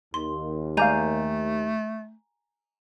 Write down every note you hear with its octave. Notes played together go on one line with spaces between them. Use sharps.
D#2 C6
G#3 A3 D5 F5 G#5 A#5 G6